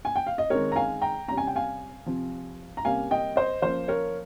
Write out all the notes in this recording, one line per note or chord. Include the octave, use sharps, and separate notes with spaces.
G#5
G5
F5
D#5
D#3 G#3 C4 A#4 C#5
A#5
F5 G#5
G5 A#5
C3 G3 C#4 A#5
G#5
G5
F5 G#5
C3 F3 C4
A#5
C3 G3 A#3 C#4 F5 G#5
D#5 G5
C5 D#5
F3 A#3 C#4 C5
A#4 C#5